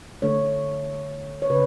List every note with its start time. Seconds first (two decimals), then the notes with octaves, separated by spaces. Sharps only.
0.22 D3 A3 C#5
1.42 C#5
1.50 C#3 B4